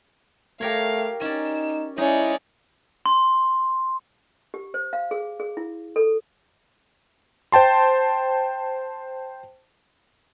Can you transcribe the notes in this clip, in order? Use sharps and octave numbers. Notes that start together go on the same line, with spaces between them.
A3 G4 A#4 C#5 F5
C#4 D#4 D5 E7
G#3 C#4 D#4 E4 D5
C6
G4
C5
F5
G#4
G#4
E4
A4
C5 G5 A5 C6